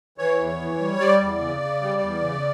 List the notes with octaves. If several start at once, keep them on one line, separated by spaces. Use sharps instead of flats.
E3 C#5
E2
E3
G3
G3 D5
E2
C#3
C#3
G3
E2
C#3